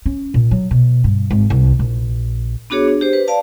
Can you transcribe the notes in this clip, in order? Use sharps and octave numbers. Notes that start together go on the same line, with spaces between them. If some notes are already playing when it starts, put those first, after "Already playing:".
C#4
A#2
F#3
B2
G2
G#1
C2
A#1
B3 D4 F#4 G#4 C#5
D4
G4 C5
B4
D5 F5 A5